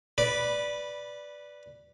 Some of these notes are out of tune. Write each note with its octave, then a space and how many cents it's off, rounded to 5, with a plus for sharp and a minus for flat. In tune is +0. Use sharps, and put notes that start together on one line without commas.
B4 +0 D5 +0 B5 -15